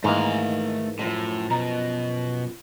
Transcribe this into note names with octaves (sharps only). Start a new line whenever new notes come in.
G#2 D#3 E3 A3 A#3 A#5
F#2 A2 F3
B2 A#5